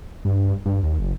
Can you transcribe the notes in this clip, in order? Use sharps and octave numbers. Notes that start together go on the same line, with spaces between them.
G2
G2
D#2
F#1